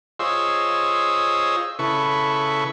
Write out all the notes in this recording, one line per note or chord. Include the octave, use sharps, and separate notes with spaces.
F4 G#4 C5 C#5 D#5 E6
C#3 E4 A4 B4 C#6